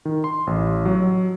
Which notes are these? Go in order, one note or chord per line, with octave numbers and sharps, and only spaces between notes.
D#3
C6
A1
F#3